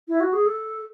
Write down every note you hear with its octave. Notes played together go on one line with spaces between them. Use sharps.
E4
F#4
G#4
A4